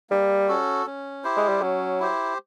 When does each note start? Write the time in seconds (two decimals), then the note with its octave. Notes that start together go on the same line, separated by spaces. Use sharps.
0.10 G3 A#3
0.48 C#4 F#4 A4
0.86 C#4
1.24 E4 G4 C5
1.37 G#3
1.49 G3
1.62 F#3 C#4
2.00 E4 G4 C5